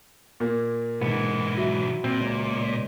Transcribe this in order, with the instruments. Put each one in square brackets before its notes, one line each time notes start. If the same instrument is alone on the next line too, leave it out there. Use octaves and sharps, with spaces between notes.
[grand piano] A#2 A#3
[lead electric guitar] B1 E3 [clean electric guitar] G#2 B3
[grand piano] F#3 E4
[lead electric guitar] A#2 [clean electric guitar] C4
[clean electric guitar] C#2